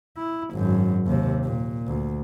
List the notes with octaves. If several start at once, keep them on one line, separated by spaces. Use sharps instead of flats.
E4
G#1 F#2
D#2 C3
A#2
D2